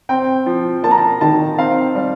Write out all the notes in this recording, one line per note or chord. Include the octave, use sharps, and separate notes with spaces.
C4 G5
F3
A#3 A5
A#5
A5
D#3 A5
C4 F5
G3